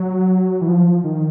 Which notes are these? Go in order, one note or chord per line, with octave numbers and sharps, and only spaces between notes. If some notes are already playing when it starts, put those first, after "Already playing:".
Already playing: F#3
E3
F3
D#3